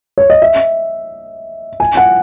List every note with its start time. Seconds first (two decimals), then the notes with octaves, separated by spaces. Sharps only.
0.18 C#5
0.30 D#5
0.42 E5
1.80 G#5
1.97 F#5